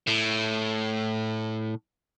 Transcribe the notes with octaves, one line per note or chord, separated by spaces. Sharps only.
A2